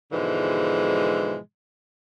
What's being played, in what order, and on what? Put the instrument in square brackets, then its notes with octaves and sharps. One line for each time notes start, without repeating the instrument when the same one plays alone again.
[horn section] G#2 B2 D3 E3 F3 G#3